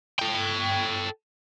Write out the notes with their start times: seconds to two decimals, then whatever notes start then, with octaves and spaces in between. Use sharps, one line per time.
0.19 A4 G5